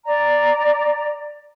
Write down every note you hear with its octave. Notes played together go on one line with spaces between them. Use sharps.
D5 A#5